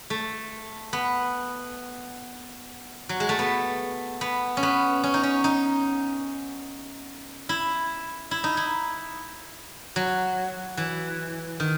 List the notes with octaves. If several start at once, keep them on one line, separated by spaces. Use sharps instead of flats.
A3
B3
F#3
G#3
A3
B3
B3
C#4
B3
C#4
D#4
C#4
D#4
E4
E4
D#4
E4
F#3
E3
D#3